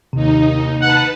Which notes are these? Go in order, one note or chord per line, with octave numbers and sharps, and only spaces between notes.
D#2 C3 D#4
B4 F#5 A5